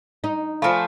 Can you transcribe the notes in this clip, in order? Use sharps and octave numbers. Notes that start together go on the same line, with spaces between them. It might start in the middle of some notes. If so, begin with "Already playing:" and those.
D#4
F3 A3 F4 F5 G#5 B5